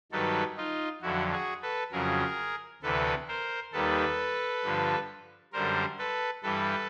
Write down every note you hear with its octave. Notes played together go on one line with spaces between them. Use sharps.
G2 D#3 F#3 A4 B4
D#4 F4
F2 D3 F#3 E4 F#4
F#4 G#4
A4 B4
F2 C#3 F#3 G#4 A#4
D2 C3 E3 A4 B4
A#4 C5
D#2 D#3 G3 A4 B4
G2 D3 F3
F#2 D3 G3 A#4 C5
A4 B4
G2 E3 G3 A4 B4